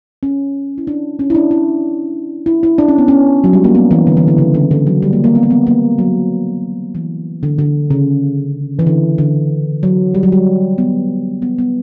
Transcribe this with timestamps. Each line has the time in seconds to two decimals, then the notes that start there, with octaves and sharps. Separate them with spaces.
0.23 C#4
0.78 E4
0.87 D4
1.19 C#4
1.30 E4
1.35 D4
1.51 E4
2.46 E4
2.63 E4
2.78 D4
2.88 C#4
2.98 B3
3.08 C#4
3.44 F#3
3.53 G3
3.64 A#3
3.75 B3
3.91 E3
4.07 D3
4.17 E3
4.28 D3
4.38 C#3
4.54 D3
4.71 D3
4.87 F#3
5.03 G3
5.13 A#3
5.24 A#3
5.35 B3
5.43 A#3
5.50 B3
5.67 A#3
5.99 F#3
6.95 E3
7.43 D3
7.59 D3
7.91 C#3
8.79 E3
8.87 D3
9.18 D3
9.83 F#3
10.15 G3
10.23 F#3
10.32 G3
10.78 B3
11.42 B3
11.58 B3